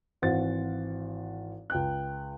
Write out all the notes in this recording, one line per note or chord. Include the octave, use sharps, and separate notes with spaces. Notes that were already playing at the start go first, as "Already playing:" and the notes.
G#1 E3 C5 F5 F#5 A6
C#2 G5 F#6